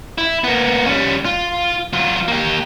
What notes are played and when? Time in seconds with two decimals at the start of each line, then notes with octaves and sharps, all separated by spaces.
0.18 E4
0.44 A#3 B3
0.86 G3 C#4
1.25 F4
1.93 F#3 F4
2.28 A#3 G4